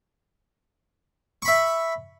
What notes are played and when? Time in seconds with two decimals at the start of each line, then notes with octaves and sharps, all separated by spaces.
1.42 C#6
1.45 B5
1.48 E5